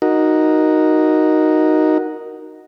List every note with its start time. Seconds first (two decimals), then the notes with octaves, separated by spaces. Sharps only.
0.02 D#4 F#4 A#4